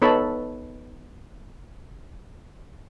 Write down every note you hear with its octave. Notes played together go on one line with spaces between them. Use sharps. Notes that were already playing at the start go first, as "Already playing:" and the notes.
B3 D#4 A4 C#5 A5 B5